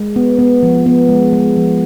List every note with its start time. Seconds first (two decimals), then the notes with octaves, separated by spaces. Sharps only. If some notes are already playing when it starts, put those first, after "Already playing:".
Already playing: G#3
0.16 B3
0.39 B3
0.63 F3
0.86 B3
1.09 G#3
1.33 G#3
1.56 F3